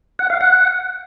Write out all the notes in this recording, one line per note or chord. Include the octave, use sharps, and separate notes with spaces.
F#5
F5
F#5